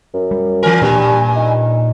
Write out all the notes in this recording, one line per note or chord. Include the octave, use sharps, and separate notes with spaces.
F#2
G3
E3 A#4 G#5
G2 A#2 G3 A#3 C#4
D#4